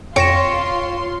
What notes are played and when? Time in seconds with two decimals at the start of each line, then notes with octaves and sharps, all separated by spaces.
0.16 F2 F4 C#5 G5 C6 A#6 E7